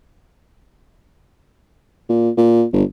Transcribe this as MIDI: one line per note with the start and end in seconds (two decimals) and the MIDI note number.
2.09 2.30 46
2.38 2.64 46
2.73 2.83 31